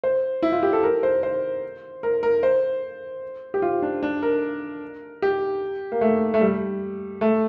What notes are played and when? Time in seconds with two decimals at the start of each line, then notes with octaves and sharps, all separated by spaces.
0.04 C5
0.42 E4
0.52 F4
0.63 G4
0.73 A4
0.83 A#4
1.03 C5
1.23 C5
2.03 A#4
2.23 A#4
2.43 C5
3.54 G4
3.62 F4
3.82 D4
4.03 D4
4.22 A#4
5.22 G4
5.92 A#3
6.01 A3
6.34 A3
6.41 G3
7.21 A3